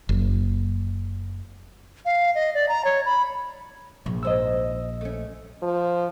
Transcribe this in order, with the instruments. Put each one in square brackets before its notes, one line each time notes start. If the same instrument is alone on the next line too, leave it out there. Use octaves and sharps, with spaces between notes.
[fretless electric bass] F#1
[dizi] F5
D#5
D5
A#5
C#5
B5
[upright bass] A#1
[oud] G#2 C5 [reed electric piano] D#5 E6
[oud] A3 C#4
[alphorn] F3